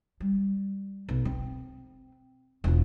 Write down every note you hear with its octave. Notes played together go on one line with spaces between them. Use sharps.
G3
B1
C4
E1 F4